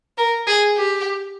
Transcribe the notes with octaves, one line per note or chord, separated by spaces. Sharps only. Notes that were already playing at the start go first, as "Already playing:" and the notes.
A#4
G#4
G4